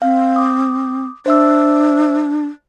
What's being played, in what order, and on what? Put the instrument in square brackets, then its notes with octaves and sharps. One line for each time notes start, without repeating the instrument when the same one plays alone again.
[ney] C4 [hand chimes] F5
[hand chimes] D6 D#6
[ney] D4 [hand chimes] C5 E5 E6